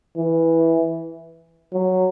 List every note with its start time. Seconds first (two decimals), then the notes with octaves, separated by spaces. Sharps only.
0.17 E3
1.73 F#3